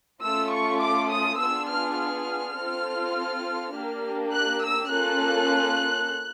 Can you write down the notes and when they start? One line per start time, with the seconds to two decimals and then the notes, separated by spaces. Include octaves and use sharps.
0.23 A3 C#4 F4 E6
0.52 C#6
0.82 D6
1.11 D#6
1.40 B3 D4 F4 G#4 E6
1.70 F6
1.98 F6
2.56 C4 F4 A4
3.74 A#3 D4 G4
4.32 F#6
4.62 E6
4.90 A#3 C#4 F4 A4 F#6